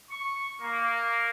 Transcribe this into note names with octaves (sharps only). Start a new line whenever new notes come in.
C#6
A#3